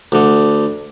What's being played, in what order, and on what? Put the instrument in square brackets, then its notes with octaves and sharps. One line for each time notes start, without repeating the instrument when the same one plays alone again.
[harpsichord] D2 D3